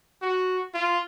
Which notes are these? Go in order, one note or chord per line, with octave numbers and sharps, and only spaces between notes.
F#4
F4